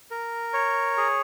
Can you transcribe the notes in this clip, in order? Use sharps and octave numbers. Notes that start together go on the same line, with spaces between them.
A#4
C#5
G#4